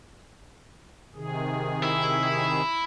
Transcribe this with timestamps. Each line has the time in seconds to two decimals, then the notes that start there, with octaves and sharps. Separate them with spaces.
1.15 C3 D#3 G#4
1.83 E4